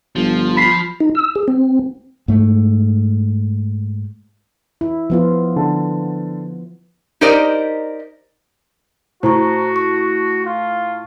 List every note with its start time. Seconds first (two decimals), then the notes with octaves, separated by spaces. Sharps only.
0.16 G1 F3
0.57 B5 B6 C7
1.00 D#4
1.15 E6
1.35 G#4
1.48 C4
2.28 G#2 A3
4.81 E4
5.10 F3 B3 F4
5.56 D3 A5
7.21 D#4 G4 A#4 C5 D5 D#5
9.23 A2 F#4 C5 A#5 C#6
9.76 C#6
10.45 F4